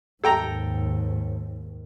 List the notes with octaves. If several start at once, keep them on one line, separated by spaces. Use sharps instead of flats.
D#2 G#2 A4 G5 A#5